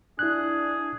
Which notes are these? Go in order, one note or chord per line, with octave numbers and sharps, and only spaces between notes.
D4 E4 G#4 F#6